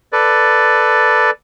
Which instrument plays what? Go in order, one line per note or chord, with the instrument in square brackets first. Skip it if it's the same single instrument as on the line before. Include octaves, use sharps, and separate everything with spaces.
[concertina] A4 B4 D5